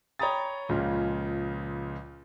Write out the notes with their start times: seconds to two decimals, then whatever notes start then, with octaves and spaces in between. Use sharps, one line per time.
0.19 C#5 G5 A#5 B5 D#6 A6
0.69 C#2 A#2 C#3 F3